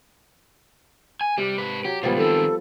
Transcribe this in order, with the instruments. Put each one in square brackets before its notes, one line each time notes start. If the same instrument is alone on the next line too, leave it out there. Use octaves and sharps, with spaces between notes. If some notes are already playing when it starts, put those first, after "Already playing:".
[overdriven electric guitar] G#5
[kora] C3 [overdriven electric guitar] G3
[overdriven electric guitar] G#2 B4
[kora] F#3 [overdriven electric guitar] G4
[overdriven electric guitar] C#2 A#2 [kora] F3 G3 B3
[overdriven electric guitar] D#3 C4 [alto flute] A4